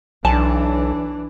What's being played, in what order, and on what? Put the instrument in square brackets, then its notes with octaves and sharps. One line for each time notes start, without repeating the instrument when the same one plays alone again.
[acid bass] B1 [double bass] E3 D4 [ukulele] A5